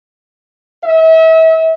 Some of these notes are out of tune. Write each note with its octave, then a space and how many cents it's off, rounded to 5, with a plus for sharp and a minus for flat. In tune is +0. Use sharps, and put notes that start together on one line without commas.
E5 -35